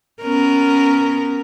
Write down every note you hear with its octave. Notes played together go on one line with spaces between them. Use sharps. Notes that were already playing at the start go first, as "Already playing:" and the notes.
B3 C#4 A#4